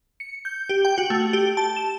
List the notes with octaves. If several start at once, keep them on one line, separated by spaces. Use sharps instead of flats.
C#7
G6
G4
G5
F#4
A3
G4
A5
E7